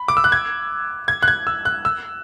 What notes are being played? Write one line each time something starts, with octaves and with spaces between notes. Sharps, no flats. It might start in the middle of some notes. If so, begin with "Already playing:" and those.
Already playing: B5
D6
E6
F#6
G#6
G#6
F#6
G#6
E6
F#6
E6